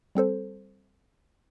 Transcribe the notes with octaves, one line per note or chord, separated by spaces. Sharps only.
G3 C4 A4 C5